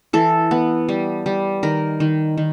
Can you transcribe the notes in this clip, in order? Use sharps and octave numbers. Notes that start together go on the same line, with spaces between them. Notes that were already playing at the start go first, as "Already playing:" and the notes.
E3 A4
B3
G3
G3
D#3 A#4
D#3
D#3